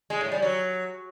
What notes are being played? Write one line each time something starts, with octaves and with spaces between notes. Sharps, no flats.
G#3
A2
G3
F#3